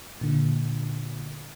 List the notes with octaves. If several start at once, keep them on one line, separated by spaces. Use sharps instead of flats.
A#2 D3